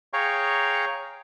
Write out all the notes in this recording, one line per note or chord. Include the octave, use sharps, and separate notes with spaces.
G#4 C#5 F5 G5 A#5 C#6